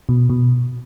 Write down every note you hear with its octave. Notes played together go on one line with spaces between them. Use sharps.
B2
B2